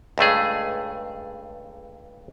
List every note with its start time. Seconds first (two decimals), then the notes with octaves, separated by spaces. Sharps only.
0.18 C#2 G2 A3 G#4